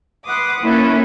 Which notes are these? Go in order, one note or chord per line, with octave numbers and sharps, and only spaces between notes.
B4 F#5 C6 D6 D#6
A#3 C#4 E4 A4